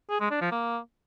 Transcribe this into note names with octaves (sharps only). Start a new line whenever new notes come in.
G#4
G#3
D4
F3
A#3